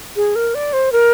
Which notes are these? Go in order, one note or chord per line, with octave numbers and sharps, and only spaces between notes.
G#4
A#4
D5
C5
A#4